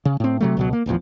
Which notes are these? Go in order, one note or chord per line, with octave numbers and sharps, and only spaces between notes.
C#3
A2 C4
C3 F#3 A3
C#2 B2 F#3
A#3
D#1 A1 E2 F3